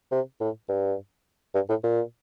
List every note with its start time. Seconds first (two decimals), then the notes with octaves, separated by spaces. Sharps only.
0.12 C3
0.41 A2
0.69 G2
1.55 G2
1.69 A2
1.84 A#2